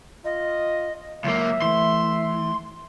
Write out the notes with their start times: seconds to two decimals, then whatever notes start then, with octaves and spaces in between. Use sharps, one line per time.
0.25 F4 D#5
1.24 C#2 F#3 A#3 E5
1.62 E3 A3 C6